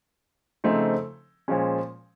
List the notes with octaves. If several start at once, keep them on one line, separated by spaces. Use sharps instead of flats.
C#3 F3 A3 C4 D#4
A#2 F3 G#3 C#4